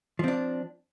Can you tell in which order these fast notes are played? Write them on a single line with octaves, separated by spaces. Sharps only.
F3 C4 D4